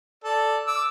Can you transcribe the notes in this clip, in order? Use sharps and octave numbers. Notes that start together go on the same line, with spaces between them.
A4 D5
D6 E6